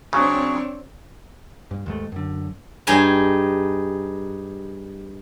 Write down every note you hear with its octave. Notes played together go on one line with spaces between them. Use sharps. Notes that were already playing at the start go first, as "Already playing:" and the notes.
C#3 F#3 C4 D4 C#5
G2
D#2 G#2 A3
F#2 D3
G2 D#4 G#4 G#5 A#5